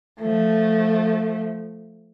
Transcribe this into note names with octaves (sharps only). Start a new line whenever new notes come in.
F3 A3